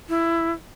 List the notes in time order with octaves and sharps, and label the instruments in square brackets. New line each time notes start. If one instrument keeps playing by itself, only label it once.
[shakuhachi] E4